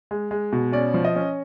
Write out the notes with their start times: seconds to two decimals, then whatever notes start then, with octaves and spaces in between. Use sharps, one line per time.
0.11 G#3
0.31 G#3
0.53 B2
0.73 C#4 D5
0.94 F3
1.05 D#5
1.16 C#4